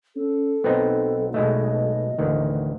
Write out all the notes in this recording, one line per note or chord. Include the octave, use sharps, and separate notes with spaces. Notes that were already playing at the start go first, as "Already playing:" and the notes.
C#4 A4
B1 B3 C4 D#4
B2 G#3 A3 D#5
A1 D2 D#3 E3